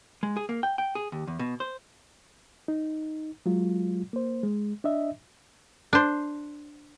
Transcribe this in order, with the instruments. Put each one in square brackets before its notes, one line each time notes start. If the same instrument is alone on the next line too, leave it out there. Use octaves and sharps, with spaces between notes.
[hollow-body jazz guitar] G#3
G#4
A#3
G5
G5
G#4
D#2
E2
B2
C5
[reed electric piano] D#4
F#3 G#3 F4
A#3 C5
G#3
D4 D#5 E5
[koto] D4 C5